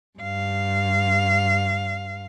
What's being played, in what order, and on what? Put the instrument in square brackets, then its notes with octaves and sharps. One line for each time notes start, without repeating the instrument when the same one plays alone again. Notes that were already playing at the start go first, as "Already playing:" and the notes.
[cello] G2 F5